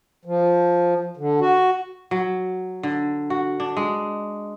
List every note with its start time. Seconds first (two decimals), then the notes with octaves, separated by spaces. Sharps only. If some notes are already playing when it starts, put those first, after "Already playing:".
0.25 F3
1.17 D3
1.40 F#4
2.11 F#3
2.83 D3
3.30 F#4
3.60 D4
3.77 G#3